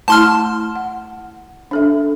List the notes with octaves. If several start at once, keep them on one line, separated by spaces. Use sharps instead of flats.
A3 E4 A5 C6 F6
F#5
D4 A4 E5